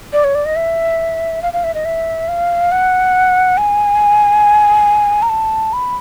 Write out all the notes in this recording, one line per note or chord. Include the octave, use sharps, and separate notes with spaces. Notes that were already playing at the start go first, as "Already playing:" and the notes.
D5
C#5
D5
D#5
E5
F5
F5
E5
D#5
E5
F5
F#5
G#5
A#5
A5
B5